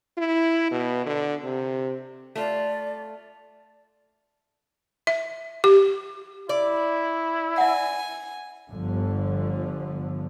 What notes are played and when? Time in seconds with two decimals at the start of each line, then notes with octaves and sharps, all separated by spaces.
0.18 E4
0.71 B2
1.06 D3
1.44 C3
2.35 A3 F4 D5
5.07 E5
5.64 G4
6.49 E4 D5
7.58 E5 F#5 G#5
8.71 G1 D3 F3